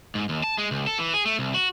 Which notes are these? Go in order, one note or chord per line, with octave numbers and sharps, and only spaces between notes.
G#2
D#2
A5
G#3
C#2
A4
E3
G#4
A3
C2
F#4